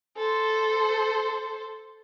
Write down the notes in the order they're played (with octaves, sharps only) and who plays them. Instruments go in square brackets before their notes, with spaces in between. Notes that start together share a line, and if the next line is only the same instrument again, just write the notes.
[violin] A4 C5